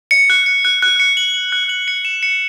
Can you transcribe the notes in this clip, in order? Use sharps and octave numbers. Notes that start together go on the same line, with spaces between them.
C#7
F#6
C#7
F#6
F#6
C#7
F#7
F#7
F#6
F#7
C#7
E7
C#7